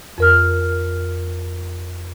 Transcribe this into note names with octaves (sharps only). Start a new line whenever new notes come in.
F2 A#4 F6